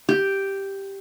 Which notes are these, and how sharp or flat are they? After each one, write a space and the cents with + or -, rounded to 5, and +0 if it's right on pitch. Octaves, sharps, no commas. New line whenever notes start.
G4 +0